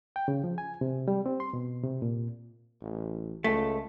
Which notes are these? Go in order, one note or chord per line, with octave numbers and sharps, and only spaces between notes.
G5
C#3
F3
G#5
C3
G3
C4
C6
B2
C3
A#2
A1
C#2 A3